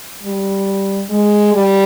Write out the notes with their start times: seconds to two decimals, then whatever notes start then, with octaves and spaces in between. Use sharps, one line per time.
0.23 G3
1.10 G#3
1.53 G3